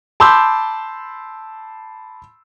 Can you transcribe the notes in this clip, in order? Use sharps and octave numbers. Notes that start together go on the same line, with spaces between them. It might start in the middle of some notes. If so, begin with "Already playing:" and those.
A5 B5 C6 D6 E6 G6